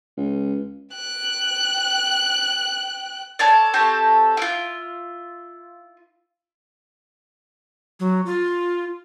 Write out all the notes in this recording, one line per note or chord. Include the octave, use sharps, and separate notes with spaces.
C#2
G5 F#6
A4 C#5 D5
C4 G4 A4 C#5
E4 F4
F#3
F4